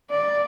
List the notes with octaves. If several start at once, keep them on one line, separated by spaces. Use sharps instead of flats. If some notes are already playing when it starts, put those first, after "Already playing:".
D5